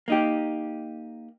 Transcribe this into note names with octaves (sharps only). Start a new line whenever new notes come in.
A#3 D#4 G4